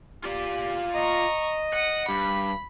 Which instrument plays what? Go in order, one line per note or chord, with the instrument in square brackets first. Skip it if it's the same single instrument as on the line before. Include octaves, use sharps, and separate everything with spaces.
[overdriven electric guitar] F4 D5 [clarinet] G4
[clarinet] D#5 [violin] A#5 C#6
[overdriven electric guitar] F#5 [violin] D#6 C#7
[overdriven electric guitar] G2 [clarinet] G4 [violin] B5